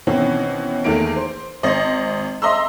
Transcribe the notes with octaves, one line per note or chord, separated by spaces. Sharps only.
B2 D#3 E3 C4 C#4
E2 D#3 A3 A#3 D7
C5
G#1 C5 D#5
D#5 E5 A#5 C6 E6